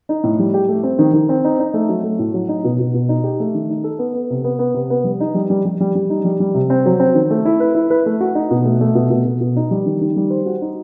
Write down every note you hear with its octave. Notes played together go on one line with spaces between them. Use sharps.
D#4
A2
G3
G4
A3
C4
D#3
D#3
C4
D#4
D#4
A3
F#3
A3
A2
F#3
D#4
B2
B2
B2
D#4
G4
A3
D#3
D#4
A4
B3
B3
C3
B3
B3
C3
B3
G3
D#4
G3
G3
G3
G3
G3
D#4
G3
G3
C3
C4
F#3
C4
D#3
A3
E4
B4
E4
B4
A3
F#4
D#4
B2
A3
A3
B2
B2
B2
B2
D#4
G3
D#3
D#3
G3
C5
F#4
D#4